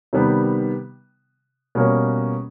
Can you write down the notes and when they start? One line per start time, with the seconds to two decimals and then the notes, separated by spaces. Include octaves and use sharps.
0.13 C3 D#3 G3 B3
1.75 B2 G3 A#3 C#4